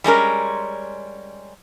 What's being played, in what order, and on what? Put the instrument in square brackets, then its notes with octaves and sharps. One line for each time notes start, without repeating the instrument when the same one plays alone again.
[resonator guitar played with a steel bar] G3 G#3 C#4 A#4